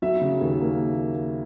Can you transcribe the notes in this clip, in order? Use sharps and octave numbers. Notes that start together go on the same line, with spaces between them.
F#3 E5
C#3
D#2
A#3